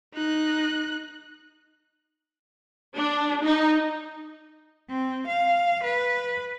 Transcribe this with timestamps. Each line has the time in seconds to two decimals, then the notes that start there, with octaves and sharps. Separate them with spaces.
0.14 D#4 F#6
2.97 D4
3.43 D#4
4.90 C4
5.27 F5
5.84 B4